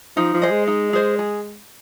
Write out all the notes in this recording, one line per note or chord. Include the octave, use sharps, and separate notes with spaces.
F3 D#4
F3
G#4 C5 D#5
G#3
D#4
G#4 C5 D#5
G#4